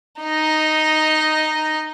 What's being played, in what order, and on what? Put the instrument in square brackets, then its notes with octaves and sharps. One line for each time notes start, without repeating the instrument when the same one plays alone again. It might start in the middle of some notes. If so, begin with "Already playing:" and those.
[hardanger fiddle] D#4 D#5